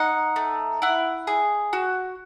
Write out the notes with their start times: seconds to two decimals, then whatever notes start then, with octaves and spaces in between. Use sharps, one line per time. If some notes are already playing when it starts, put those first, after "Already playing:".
Already playing: D#4 F#5
0.36 A3
0.82 E4 F#5
1.27 G#4
1.73 F#4